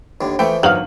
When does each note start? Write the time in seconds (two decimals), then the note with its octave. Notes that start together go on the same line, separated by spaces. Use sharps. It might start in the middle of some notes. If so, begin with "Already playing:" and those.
0.21 D#2 A2 D3
0.39 E3 F3 A3 E4 E5 G5
0.63 G1 D#3 F#3 B3 F5 F#7